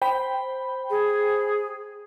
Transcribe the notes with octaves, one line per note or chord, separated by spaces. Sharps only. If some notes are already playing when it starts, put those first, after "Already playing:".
C5 G5 B5
G#4